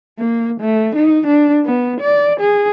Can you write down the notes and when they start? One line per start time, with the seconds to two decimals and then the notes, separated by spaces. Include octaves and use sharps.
0.19 A#3
0.60 A3
0.95 D#4
1.27 D4
1.65 B3
2.01 D5
2.40 G#4